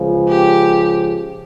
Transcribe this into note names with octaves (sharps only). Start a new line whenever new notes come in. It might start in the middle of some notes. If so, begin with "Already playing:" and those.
Already playing: C#2 C#3 F3
G4